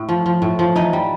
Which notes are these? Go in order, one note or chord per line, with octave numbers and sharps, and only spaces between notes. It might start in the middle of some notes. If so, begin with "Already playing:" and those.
Already playing: A2
F3
F3
A2
F3
E3 D#4 D#5
G3